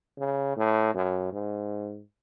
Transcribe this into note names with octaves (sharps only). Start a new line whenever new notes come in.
C#3
A2
F#2
G#2